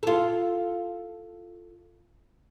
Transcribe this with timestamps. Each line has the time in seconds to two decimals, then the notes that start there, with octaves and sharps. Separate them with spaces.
0.03 F4 A4